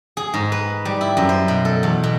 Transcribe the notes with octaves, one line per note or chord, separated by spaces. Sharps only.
G#4
G#2
B4
G3
E4
F#2
C5
B2
A4
E2
B2